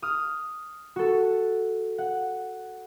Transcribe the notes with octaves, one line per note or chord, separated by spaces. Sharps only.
D#6 F6
F#4 A4
F#5